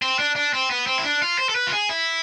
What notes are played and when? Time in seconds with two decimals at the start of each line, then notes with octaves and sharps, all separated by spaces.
0.02 C4
0.19 D4
0.36 D4
0.53 C4
0.70 B3
0.87 C4
0.98 E4
1.04 D4
1.22 F4
1.39 C5
1.49 A4
1.55 B4
1.67 F4
1.73 G#4
1.89 E4